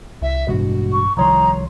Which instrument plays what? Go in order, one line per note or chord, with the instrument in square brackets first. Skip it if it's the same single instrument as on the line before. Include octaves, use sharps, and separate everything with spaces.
[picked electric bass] C2 [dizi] E5
[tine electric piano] A1 G2 [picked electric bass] B2 G#3 [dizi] F#4
[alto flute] C#6
[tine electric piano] C2 C#5 C6 [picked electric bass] D#3 F3 [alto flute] A#5 [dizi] D#6